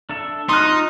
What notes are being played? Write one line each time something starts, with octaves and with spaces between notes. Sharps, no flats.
D4 A4 E5
D#4 D#5 C6 F6 F#6
F4